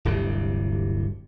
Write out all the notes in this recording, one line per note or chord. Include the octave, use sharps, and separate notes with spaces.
D1 G1 C3 G3